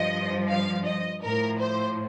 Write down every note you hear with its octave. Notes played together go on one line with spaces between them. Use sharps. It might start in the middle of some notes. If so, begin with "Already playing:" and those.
Already playing: G2 F3 D#5
F5
D#5
A2 F3 A#4
C5